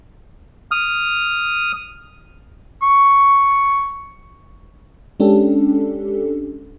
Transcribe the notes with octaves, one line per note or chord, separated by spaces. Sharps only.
D#6 F6
C#6
G#3 C#4 D4 G4 A4